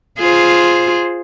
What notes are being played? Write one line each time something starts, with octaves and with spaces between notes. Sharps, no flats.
F4 G#4 C5